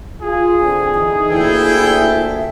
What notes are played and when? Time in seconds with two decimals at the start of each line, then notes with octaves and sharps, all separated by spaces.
0.21 F4 G#4
0.60 D3 C4 G#5
0.95 E3 D#4 D#6
1.30 D2 A#2 A#3 E4 A4 G5
1.90 E5